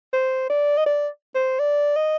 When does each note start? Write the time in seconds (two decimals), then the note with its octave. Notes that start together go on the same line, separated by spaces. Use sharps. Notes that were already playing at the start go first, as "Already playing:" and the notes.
0.13 C5
0.50 D5
0.78 D#5
0.86 D5
1.35 C5
1.60 D5
1.96 D#5